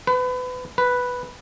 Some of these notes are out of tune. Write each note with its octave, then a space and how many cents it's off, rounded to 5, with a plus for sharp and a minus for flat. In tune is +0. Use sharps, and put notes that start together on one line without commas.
B4 +30
B4 +0